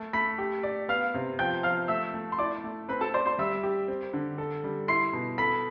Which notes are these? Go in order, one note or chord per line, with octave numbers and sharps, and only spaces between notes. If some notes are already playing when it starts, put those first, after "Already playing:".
Already playing: A3
A3 B5 B6
G4
D5
B3 F5 F6
C3
F3 G5 G6
F3 F5 F6
A3 E5 E6
A3
C6
E4 D5 D6
A3
C4 B4 B5
A4 A5
C5 D5 C6
C5 C6
G3 E5 E6
G4
C4
D3
A4
G3
E4 C6 C7
B2
A4 B5 B6